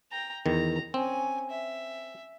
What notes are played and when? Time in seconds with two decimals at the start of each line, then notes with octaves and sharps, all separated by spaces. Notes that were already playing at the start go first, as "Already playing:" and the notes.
0.11 G5 A#5
0.46 E2 D#3 A#5
0.94 C4 C#4 G#5
1.50 E5